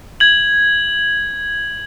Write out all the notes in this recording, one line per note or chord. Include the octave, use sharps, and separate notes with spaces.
G#6 F#7